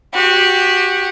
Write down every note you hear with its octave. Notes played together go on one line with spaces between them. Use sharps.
F#4 G4